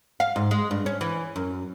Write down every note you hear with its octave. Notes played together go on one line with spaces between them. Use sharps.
F5
G#2
G#3
G2
C#4
E3
F#2